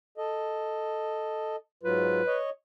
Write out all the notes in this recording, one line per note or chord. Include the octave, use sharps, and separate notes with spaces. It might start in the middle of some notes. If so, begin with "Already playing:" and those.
A4 D#5
G#2 F#3 F4 B4
C#5 D#5